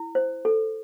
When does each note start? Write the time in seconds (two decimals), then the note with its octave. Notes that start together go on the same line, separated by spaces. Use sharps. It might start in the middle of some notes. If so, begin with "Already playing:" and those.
Already playing: E4
0.15 C5
0.45 A4